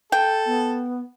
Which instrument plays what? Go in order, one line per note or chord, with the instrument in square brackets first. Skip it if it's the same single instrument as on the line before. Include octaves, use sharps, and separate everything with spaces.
[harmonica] A4 [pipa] G5
[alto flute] B3